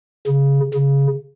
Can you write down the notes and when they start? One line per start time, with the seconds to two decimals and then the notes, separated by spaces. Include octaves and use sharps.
0.27 C#3
0.74 C#3